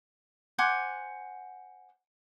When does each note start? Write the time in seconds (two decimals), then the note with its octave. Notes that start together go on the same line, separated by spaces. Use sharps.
0.58 C5 F#5 G#5 D6